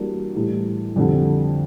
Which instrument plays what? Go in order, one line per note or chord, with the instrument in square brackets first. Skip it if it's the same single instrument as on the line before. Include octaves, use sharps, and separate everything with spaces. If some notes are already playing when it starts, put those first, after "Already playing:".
Already playing: [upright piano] E3 G3 A#3 D4 F#4
A2 E3 G3
F2 D3 G3